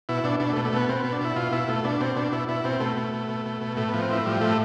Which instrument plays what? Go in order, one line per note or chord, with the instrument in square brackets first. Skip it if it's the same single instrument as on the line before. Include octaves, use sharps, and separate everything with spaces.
[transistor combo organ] B2 E4
B2 D4
B2 D4
A3
B2
A3
B2 B3
B2 C4
B2 B3
D4
B2 E4
B2 F4
B2 E4
B2 A3
B2 D4
B2 C4
B2 D4
B2 E4
B2 E4
B2 C4
B2 A3
B2
B2
B2
B2
B2
A2 A3
F3 B3
C4
A2 E4
F3 G3
A2 A3